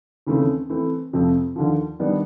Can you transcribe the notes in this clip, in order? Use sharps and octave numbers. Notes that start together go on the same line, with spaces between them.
D#2 C#3 E3 A3 C4
E3 A3 C4
F2 C3 F3 A3 C4
D#2 D3 F3
D#3 G3 B3 D4